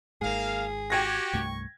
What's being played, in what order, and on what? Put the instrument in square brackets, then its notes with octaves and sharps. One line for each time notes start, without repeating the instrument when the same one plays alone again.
[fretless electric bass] G#1 G#2 [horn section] A#3 F5 [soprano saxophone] G#4
[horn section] F#4 G4 [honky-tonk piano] G5 G#6 A#6
[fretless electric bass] C2 G2 A3 [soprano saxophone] C#6